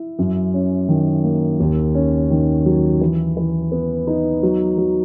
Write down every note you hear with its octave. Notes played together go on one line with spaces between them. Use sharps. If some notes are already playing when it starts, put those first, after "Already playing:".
Already playing: E4
F#2
C#4
D#3
A#3
D#2
C#4
D#3
F#3
E3
E3
B3
D#4
F#3
F#3